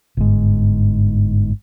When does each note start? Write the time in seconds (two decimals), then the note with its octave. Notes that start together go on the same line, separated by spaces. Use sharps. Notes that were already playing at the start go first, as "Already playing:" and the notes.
0.17 G1 G#2